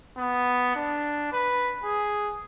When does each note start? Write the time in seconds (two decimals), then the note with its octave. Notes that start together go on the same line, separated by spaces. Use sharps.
0.18 B3
0.76 D4
1.32 B4
1.84 G#4